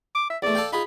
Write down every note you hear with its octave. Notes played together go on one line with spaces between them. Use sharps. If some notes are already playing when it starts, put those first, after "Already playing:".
D6
E5
E2 A3 D5
A4 F5 G5
D#4 F4 G#4 B5